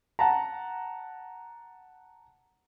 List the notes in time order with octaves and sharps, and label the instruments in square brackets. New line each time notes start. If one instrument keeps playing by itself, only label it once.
[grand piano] F#5 A5 A#5